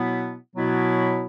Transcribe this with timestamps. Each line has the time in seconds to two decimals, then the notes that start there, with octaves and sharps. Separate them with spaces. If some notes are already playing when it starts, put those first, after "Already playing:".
Already playing: B2 F#3 B3 E4
0.55 B2 F#3 B3 E4